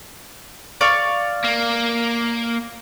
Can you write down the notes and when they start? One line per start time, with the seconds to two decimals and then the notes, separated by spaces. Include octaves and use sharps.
0.81 D5 F5 C#6
1.44 A#3